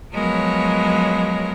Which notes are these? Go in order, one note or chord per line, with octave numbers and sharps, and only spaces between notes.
F3 F#3 G#3 B3 A#4 C#5